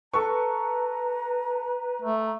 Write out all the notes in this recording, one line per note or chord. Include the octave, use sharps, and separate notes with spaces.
A4 B4 A#5 C#6
A3